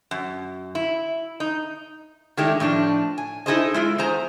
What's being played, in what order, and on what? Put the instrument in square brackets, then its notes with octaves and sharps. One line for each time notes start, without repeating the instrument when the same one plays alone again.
[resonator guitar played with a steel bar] F#2
E4
D#4
D#3 G#3 A3 D4 E4 G4
A2 F3 D4 D#4
G#5
D#4 E4 G#4 A4 C5 D#5
G#3 E4 F4
E2 G#4 C5 G#5 A#5